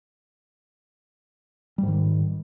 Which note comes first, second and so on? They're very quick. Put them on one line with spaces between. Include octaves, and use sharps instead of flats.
G3 G#2 D#3